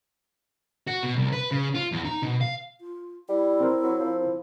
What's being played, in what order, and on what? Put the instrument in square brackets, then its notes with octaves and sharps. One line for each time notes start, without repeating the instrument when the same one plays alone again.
[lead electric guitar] F#4
B2
C2
B4
C#3
F4
E2
D#4
B2
F5
[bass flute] F4
[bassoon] G3 [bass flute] E4
[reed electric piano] C4 A#4 C5
[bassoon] F#3
F3